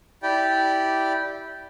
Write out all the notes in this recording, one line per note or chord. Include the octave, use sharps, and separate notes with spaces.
E4 G4 D5 G5